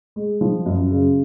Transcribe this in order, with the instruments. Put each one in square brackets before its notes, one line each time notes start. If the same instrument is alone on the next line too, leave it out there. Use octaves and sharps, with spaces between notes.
[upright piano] G#3
F3
F#2
C#3